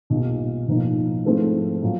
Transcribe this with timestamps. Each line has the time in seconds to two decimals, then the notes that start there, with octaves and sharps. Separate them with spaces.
0.10 B1 A#2 G3
0.68 B1 A2 F3 A#3 D#4
1.25 G#2 F3 A3 C4 E4
1.82 A#2 F#3